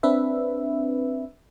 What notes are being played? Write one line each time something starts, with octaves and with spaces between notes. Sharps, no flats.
C4 D4 B4 E5